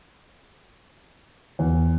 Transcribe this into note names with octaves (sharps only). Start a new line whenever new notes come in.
E2